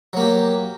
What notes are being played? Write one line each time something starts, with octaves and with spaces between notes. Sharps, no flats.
F#3 A#3 G4